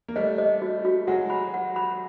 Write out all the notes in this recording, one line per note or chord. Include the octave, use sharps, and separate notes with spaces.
A#3
G3 A3 D#5
D#5
F#4
F#4
F#3 G#3 F#5
B5
F#5
B5